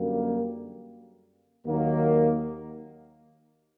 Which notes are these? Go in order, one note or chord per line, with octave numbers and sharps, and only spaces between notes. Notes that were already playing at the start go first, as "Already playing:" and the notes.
Already playing: F#2 D3 G3 A#3
D#2 D#3 F#3 A#3